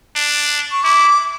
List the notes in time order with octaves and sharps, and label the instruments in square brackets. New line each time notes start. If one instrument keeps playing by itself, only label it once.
[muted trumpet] D4
[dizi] C#6
[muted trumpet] E4 [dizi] D6